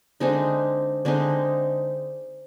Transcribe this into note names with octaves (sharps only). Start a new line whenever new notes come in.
D3 G#3 C4 D#4
D3 G#3 C4 D#4